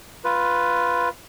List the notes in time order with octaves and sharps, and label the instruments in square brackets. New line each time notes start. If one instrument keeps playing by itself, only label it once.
[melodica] F4 B4